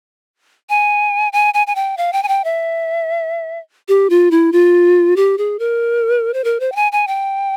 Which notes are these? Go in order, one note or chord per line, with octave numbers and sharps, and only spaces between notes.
G#5
G#5
G#5
G#5
G5
F5
G5
G#5
G5
E5
G4
F4
E4
F4
G4
G#4
A#4
C5
A#4
C5
G5
G#5
G#5
G5